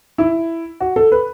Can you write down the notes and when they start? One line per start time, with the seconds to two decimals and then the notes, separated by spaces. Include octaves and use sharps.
0.18 E4
0.80 F#4
0.96 A4
1.12 B4